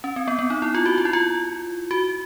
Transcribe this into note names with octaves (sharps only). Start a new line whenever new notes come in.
C#4
C4
B3
B3
D#4
E4
F4
F#4
F4
E4
F4
F#4